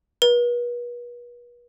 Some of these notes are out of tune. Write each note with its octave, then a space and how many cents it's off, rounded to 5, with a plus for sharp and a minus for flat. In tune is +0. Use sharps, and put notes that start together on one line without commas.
B4 -40